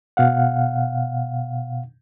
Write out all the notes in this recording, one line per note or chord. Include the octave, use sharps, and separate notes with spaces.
B2 F5 F#5